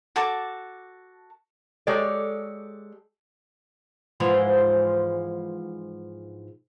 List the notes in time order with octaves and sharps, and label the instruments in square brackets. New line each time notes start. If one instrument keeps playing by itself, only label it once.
[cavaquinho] F#4 A4 A5 D6
[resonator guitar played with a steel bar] G#3 G4 A4 C#5 D5
[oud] G#2 E3 F3